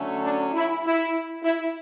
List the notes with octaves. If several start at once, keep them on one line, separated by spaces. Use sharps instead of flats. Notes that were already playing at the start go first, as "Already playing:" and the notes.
Already playing: D3 F#3 A3 C#4
D4
E4
E4
E4